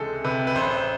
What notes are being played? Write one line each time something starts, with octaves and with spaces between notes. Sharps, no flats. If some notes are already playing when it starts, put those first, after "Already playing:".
Already playing: C#2 C3 E3 G#3 G#4 A4
C3 B4
B4
A1 C5